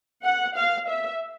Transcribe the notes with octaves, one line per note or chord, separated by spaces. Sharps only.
F#5
F5
E5